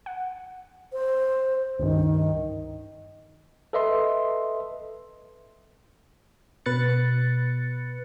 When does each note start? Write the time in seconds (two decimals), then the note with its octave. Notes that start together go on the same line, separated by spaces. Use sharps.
0.06 F#5
0.93 C5
1.79 C#2 G2 D#3
3.73 A4 B4 D#5 E5 C6
6.66 B2 B4 F#6 A6 C#7